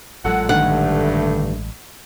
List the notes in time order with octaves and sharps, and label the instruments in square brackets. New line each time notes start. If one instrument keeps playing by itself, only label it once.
[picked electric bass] A1 F#3 G#3 [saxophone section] A#2 A4 F#5
[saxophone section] G2 A3 [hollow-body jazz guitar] A#2 D3 D#3 [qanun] F#5